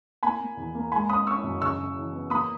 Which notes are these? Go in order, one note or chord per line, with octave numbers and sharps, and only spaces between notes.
A#3 G#5 B5
A#3
E2
A#3
G#3 G#5 B5
C#4 B5 D#6
C#4 C#6 E6
F#2
C#3 C#6 E6
C#3
E3
B3
A#3 B5 D#6